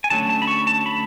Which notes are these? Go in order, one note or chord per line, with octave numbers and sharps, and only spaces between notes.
G#5
D3 F#3 A3 C#4 A5
A5
B5
C#6
A5
B5